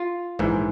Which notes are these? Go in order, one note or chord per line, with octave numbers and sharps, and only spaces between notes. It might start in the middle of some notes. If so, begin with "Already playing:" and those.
Already playing: F4
A#1 G#2 E3